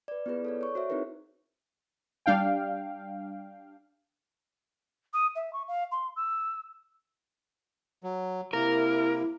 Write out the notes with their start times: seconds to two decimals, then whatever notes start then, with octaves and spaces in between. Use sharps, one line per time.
0.08 B4 D5
0.26 B3 E4 F4 G#4 B4
0.45 A4 C#5 D5
0.61 C#5 C#6
0.75 F#4 C5 C#5 E5
0.89 C4 D#4 E4 G#4 A#4 B4
2.26 G3 D4 F5 G5
5.13 D#6
5.36 E5
5.53 C#6
5.68 F5
5.92 C6
6.16 E6
8.03 F#3
8.53 C3 A#3 E4 A#4